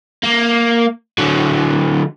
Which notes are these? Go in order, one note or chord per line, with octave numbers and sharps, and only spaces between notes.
A#3
D3 F#3